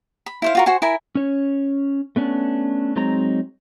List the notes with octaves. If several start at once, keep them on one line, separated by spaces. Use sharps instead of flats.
B5
E4 C5 F5
F4 F#4 A#4
F#4 C5 G#5 C6
E4 A#4 G#5 B5
C#4 C#5
A3 B3 C#4 D4
F#3 G#3 C4 D#4 C#5 A#5